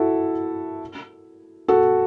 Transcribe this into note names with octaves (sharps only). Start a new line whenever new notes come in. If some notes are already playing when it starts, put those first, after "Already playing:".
Already playing: E4 F#4 A4
F#4 A4